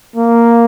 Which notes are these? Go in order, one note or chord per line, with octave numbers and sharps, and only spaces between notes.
A#3